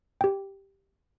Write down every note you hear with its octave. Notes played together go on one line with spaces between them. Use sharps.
G4 G5